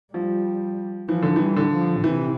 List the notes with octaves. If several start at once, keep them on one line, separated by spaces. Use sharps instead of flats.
F3 G3
E3 F3
D3
E3 G3
D3
F3
C3 E3